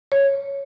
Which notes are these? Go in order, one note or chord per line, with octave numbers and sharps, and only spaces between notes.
C#5